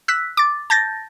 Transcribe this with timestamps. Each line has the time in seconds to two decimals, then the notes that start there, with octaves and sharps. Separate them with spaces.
0.08 E6 F#6 B6
0.37 D6 A6
0.70 A5 G6 A6 A#6